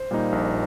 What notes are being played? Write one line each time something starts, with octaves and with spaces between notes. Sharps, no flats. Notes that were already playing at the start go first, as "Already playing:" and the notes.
Already playing: C5
A#2 G3 A#3 D#4
A#1